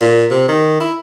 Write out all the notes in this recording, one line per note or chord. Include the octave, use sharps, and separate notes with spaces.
A#2
C3
D#3
E4